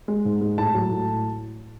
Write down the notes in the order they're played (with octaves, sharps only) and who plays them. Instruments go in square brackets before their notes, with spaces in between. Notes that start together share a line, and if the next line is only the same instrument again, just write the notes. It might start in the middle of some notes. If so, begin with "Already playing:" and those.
[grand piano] G#3
G#2
G#3
A2 A5
F#3
A2